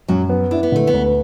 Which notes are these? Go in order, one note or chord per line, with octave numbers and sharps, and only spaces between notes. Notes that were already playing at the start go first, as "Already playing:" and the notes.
F#2 F#3
B3
D4 E4
B3
D3 A3
B3
D2